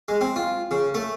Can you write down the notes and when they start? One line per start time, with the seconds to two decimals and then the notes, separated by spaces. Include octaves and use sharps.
0.08 G#3
0.21 C4
0.36 F4
0.71 C#3
0.94 A3